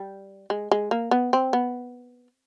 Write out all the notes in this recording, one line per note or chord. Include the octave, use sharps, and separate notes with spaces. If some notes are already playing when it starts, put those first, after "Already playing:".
Already playing: G3
G#3
G#3
A#3
B3
C4
B3